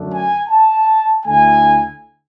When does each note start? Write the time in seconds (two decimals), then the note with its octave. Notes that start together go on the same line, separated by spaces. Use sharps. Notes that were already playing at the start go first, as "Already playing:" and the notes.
Already playing: F#2 D3 F#3 A3 D4
0.09 G#5
0.49 A5
1.26 D2 D3 A3 E4 G#5